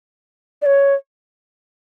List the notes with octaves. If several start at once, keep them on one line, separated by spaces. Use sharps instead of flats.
D5
C#5